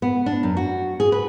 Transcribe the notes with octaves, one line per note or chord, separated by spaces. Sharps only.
B3
D4
F#2
F#4
G#4
B4